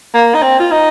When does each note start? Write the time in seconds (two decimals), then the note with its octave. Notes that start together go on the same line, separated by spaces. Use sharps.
0.14 A#3
0.34 D#4
0.42 C4
0.60 F4
0.71 D#4